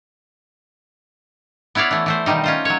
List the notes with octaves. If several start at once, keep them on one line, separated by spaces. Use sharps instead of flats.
B3 E4 C#5 D5 F5
E3 A3
E3 A3 C5
B2 D#3 G3 D#4
C#4 F4 C5
F#3 C#5